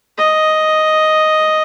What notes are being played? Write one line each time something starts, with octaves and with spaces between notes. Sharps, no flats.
D#5